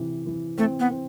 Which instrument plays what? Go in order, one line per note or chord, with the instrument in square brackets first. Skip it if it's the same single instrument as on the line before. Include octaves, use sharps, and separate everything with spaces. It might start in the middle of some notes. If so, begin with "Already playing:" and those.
Already playing: [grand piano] C3 E3
E3
[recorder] A3 [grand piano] C4
[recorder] B3
[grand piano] C4